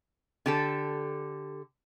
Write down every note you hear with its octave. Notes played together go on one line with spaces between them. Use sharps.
D3 G4 A4